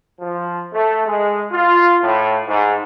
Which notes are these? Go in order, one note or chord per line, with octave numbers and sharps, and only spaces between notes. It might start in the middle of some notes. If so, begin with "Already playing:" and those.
F3
A3
G#3
F4
A2
G#2